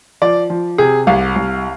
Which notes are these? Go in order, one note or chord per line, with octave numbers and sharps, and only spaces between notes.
F3 D5
F3
C3 G#4
C2 F5
C2